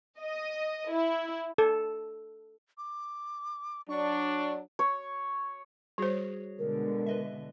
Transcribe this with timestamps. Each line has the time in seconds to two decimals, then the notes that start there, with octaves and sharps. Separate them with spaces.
0.21 D#5
0.90 E4
1.58 A4
2.78 D6
3.89 F#3 D4 C#6
4.79 C#5
5.98 G3 F#4 G#4 C5 C#5
6.58 B2 D3 G#3 A#4
7.06 B4 D#5 E5